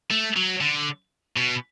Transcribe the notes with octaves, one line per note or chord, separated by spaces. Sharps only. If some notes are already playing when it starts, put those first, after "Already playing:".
A3
F#3
D3
B2